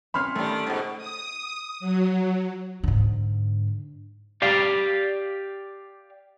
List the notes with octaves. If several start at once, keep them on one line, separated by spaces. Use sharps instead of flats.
C4 C#4 B5 C6 F6
D#3 G3 A3
G#2 B2
D#6
F#3
G#2 D3
G4 D5 F5